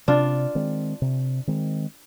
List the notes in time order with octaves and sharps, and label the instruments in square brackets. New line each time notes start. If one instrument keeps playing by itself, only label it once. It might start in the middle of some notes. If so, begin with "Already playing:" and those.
[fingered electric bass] C3 [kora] D4 F4
[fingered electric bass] D#3 G#3 C4
C3
D#3 G#3 C4